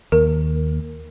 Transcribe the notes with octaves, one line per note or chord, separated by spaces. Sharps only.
D#2 A#4